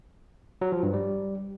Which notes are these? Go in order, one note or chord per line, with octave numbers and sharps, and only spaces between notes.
F#3
F3
G2
G3